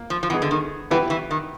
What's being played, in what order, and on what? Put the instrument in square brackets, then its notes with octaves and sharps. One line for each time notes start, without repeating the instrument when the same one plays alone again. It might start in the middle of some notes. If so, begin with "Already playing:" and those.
Already playing: [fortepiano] A#3
[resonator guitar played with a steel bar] F3
F3
[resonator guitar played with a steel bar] E3 [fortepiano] B3 D#4 G#4
[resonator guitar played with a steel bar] D3
D#3
[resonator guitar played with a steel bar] E3 [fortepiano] B3 E4 G4 B4
[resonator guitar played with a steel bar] E3
D#3